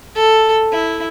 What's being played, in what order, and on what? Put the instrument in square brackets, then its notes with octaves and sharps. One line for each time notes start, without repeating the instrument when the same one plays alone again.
[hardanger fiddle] A4
E4